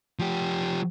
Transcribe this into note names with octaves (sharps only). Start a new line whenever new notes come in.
F3 G4